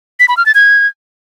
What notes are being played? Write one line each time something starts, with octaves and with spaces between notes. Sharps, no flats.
B6
B5
F6
A6
G#6